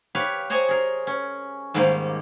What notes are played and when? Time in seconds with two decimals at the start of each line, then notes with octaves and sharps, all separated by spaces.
0.15 G4 B4 C#5 F5
0.50 C5 C#5 D#5 G#5 A#5
0.69 G#4 A#4
1.07 C#4
1.74 G#2 D#3 G3 G#3 A#3